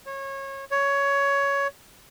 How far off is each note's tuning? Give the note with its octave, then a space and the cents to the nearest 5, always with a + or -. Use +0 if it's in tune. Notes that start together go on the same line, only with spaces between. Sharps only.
C#5 -25
C#5 +15